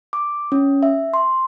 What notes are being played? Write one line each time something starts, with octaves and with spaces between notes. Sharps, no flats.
D6
C#4
E5
C6